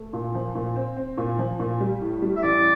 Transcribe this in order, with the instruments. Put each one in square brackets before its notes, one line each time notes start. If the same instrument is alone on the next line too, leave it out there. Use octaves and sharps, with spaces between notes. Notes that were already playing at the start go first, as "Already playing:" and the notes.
Already playing: [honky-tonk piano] A3
A#2
F3
A#2
C4
C4
A#2
F3
A#2
G3
A2
G3
[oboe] E5
[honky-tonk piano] A1 [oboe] D5